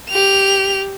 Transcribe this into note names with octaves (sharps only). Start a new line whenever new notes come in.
G4 F7